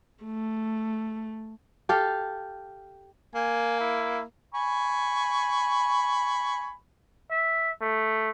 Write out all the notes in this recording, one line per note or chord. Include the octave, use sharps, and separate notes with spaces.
A3
G4 A4 F5
A#3 G#5
E4
G#5 B5 C#6
E5
A3